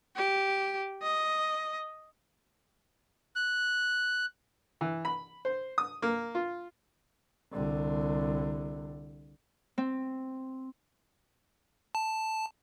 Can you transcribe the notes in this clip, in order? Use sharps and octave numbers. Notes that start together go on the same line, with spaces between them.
G4
D#5
F#6
E3
B5
C5
D#6
A#3
F4
C2 D3
C4
A5